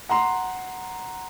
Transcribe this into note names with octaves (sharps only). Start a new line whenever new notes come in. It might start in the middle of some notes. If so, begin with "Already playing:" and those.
F#5 A#5 C6